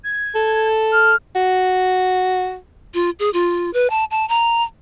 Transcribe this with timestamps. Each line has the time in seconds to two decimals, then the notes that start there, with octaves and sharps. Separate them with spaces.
0.04 G#6
0.35 A4
0.92 F6
1.36 F#4
2.94 F4
3.19 G#4
3.33 F4
3.74 B4
3.90 A5
4.11 A5
4.29 A#5